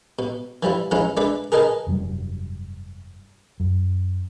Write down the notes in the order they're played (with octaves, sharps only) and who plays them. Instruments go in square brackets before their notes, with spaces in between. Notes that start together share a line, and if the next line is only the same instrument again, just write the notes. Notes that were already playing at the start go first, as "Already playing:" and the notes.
[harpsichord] B2
E3 F3 G3 E4
E3 F3 G#3 C#4 D#4 E4
G#3 D4 B4 D5 E5
G#4 A#4 B4 D#5 G#5 A5
[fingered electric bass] F1 G2 F#3 G3
F#2